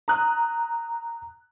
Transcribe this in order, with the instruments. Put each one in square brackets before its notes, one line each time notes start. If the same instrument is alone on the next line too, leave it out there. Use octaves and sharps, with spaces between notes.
[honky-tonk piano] A#5 D#6 F#6